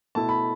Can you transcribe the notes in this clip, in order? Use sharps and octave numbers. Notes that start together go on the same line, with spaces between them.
B2 A3 E4 A5
B5